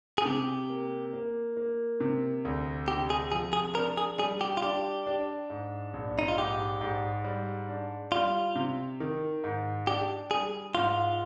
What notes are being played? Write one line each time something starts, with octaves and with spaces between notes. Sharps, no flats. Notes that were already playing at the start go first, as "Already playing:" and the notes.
G#4
C3 G4
A#3
A#3
A#3
C3
D2
C3 G4
G#4
F3 G#4
G#4
D4 A#4
G#4
G3 G#4
G4
F4
D4 G4
D4
G#2
A#1
D#4
F4
G#2 G4
G#2
G3
D4
G3 F4
C3
D#3
G#2
D4 G4
G3 G#4
G#2 F4